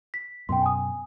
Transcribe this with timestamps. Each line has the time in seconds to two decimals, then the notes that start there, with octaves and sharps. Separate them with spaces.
0.14 B6
0.49 F#2 B2 G5 C6
0.62 G#5 D#6